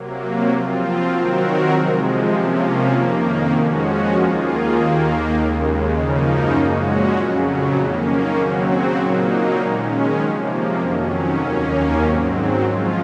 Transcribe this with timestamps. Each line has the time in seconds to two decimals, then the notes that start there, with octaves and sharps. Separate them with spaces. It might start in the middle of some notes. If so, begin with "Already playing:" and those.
Already playing: C3 F#3 A#3
0.49 F3 C4 F4
1.09 D#3 F#3 C4 F#4 A#4
1.69 C3 F3 G#3
2.30 C3 F3 A#3 C#4
2.90 F2 D#3 A#3
3.51 F3 G#3 C#4 F#4
4.12 D#2 D#3 A#3 F4 G#4
4.73 D#2 D#3 A#3
5.33 D#2 C#3 G#3
5.93 F#2 C#3 F3 A#3 D#4
6.55 A#2 G#3 C#4 F#4
7.16 F2 C#3 F#3
7.76 D#3 A#3 C#4
8.36 C#3 F#3 C4 F#4
8.98 A#2 F#3 A#3 D#4
9.58 D#3 G#3 C#4
10.18 C3 F3 A#3
10.79 F2 D#3 F#3 C#4
11.40 D#2 D#3 A#3 C#4
12.01 G#2 F#3 C4
12.62 F3 G#3 C#4 F4